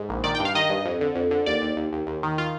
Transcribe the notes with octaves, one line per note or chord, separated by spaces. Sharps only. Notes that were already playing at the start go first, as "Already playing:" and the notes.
Already playing: G#2
A#1
D#3 D5
G5
G2
F5
D#3 D#5
G2
F2
D3
F2
D3
D#2 D5
D#2
D#2
D#2
D#2
D#3
F4